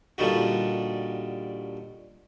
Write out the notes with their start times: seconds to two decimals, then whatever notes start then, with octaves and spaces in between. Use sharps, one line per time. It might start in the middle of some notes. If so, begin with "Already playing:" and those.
0.18 A#2 D3 G3 D#4 F#4